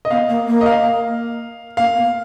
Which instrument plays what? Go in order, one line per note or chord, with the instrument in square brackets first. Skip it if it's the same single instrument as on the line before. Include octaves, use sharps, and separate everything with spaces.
[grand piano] D#5
[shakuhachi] B3 [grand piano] F5
[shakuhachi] A#3
A#3
[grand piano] D#5
F5
[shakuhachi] A#3 [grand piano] F5
[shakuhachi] B3